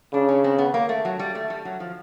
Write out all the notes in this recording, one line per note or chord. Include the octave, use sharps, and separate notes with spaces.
C#3 D4
C#4
C4
B3
A#3
A3
F#3
G3
A3
G3
F#3
F3